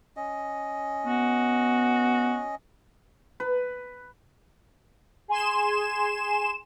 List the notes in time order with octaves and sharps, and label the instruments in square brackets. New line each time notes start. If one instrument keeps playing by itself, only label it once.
[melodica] C#4 D#5
[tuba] B3 [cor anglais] F#4
[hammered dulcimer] B4
[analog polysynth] G#4 G#5 C6 E7